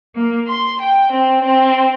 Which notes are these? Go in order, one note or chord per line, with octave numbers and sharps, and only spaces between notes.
A#3
C6
G5
C4
C4